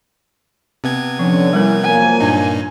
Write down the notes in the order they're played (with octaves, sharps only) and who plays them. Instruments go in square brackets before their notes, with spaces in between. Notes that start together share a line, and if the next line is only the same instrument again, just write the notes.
[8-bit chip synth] C3 B3 G#6 [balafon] C4
[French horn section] D3 C#4 [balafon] F3
[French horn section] E3 [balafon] G3 A#4
[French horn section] F3 F#3 A#3 [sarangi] G#5
[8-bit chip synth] G2 A#2 D#4 [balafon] D4